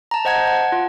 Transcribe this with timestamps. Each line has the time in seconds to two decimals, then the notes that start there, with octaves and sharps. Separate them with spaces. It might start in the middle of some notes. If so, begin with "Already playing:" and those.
0.11 A5 A#5
0.25 C5 D#5 F#5 A5 G#6
0.47 F#5
0.72 F4